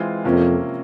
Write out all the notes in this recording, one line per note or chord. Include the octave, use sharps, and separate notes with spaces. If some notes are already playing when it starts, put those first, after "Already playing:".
Already playing: E3 G#3 C4 F4
F2 C3 F3 A#3 C#4